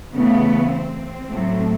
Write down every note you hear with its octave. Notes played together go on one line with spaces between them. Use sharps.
C#3 E3 A3 B3
C4
A2 F#3 A3